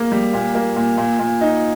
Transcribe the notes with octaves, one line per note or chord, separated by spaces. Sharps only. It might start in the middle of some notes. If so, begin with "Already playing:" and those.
Already playing: A#3 G#4
G3
A#2
A#3
A#2
A#2
A#2
D#4